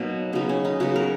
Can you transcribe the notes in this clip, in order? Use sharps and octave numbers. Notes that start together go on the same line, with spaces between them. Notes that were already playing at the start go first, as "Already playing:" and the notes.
Already playing: B2 F#3 A#3 D#4
C#3 F#3 B3 D#4
C#4
D#4
C#3 F#3 B3 F#4
A#4